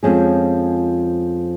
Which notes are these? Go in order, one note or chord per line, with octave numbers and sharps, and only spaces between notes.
F2 F3 G#3 C#4 G#4